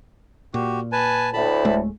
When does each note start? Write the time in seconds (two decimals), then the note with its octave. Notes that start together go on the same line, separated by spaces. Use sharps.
0.54 A#2 F#4 G4
0.92 B4 G#5 A5
1.33 D2 A2 A5 B5
1.65 D1 G#3 A3